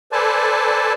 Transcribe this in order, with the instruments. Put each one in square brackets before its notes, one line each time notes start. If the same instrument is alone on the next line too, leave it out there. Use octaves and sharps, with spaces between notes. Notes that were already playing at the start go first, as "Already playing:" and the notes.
[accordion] A4 B4 C5 D5 G#5 A5